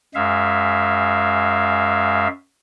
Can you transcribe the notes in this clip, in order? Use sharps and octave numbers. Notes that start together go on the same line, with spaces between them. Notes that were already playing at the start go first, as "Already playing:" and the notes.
F#2 G#3 E5 F5